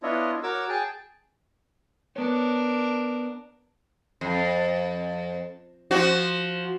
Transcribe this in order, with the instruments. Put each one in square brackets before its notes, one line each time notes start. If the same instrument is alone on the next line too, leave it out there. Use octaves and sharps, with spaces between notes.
[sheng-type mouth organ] B3 D4 E4 F4 C#5 D#5
F#4 A#4 C#5 D6 E6
G#4 G5 A5
[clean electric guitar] B3 C#5 [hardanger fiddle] D4 A#4
[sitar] F2
F3 F#4